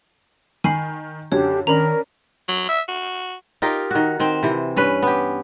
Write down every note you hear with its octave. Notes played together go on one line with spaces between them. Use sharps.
D#3 G#5 B5 C7
F#2 D3 G4 C#5
D#3 C#4 D4 A#4 A#5 B5
F#3
E5
F#4
D#4 F4 G4 A#4
D#3 F#4
D#3 C4
C3 E3
G2 C#4 B4
B3 G4